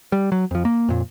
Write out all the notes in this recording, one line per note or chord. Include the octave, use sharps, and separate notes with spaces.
G3
F#3
F2 F3
A#3
F2 A#2